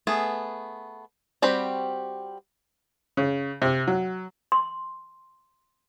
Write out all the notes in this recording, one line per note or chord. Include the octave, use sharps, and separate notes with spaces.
A3 B3 G#4
G3 C4 F#4 G4 B5
C#3
C3
F#3
C6